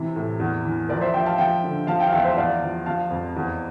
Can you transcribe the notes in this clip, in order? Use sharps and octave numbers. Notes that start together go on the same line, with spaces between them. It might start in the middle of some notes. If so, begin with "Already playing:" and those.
Already playing: C3 E3
A2
E2
E3
F3 A#4 D5
C5 E5
F3 E5 G5
F5 A5
F3 E5 G5
D3
F3 F5 A5
E5 G5
F5
E2 E5 G5
C5 E5
E2 D5 F5
F3
F3 F5 A5
F2
E2